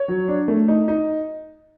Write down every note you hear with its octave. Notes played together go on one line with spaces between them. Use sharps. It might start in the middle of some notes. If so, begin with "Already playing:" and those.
Already playing: C#5
F#3
D4
A3
D#4
D#4